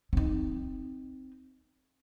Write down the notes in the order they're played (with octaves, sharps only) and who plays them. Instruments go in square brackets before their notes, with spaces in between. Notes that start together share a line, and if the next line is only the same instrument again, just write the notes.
[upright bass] C4 D#4